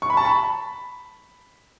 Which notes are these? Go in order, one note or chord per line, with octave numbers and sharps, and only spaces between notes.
C#6
B5
A5
B5